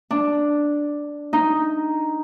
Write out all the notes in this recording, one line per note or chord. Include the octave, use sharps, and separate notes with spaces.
D4
D#4